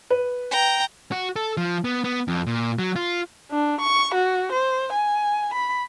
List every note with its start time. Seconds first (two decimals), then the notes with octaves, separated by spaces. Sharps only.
0.10 B4
0.51 G5 A#5
1.12 F#4
1.36 A4
1.57 F3
1.84 B3
2.04 B3
2.28 F2
2.47 A#2
2.79 F#3
2.96 F4
3.51 D4
3.81 C#6
4.14 F#4
4.52 C5
4.92 G#5
5.54 B5